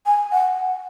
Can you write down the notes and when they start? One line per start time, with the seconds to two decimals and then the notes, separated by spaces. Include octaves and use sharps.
0.06 G#5
0.32 F#5